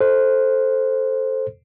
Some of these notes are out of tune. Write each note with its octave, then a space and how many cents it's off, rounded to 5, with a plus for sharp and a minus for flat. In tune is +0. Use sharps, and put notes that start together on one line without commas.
A4 +0 C5 +5